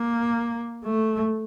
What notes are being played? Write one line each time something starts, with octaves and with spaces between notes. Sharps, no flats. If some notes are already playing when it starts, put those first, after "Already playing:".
Already playing: A#3
A3